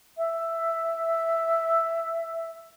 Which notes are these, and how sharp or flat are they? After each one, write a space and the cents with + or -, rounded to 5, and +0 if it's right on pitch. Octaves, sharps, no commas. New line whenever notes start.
E5 +5